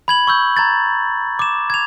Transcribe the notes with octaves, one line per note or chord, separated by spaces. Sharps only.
B5 G#6 F#7
C#6 E6 G6
A#5 G#6 A6
D6 E7
G#6 F7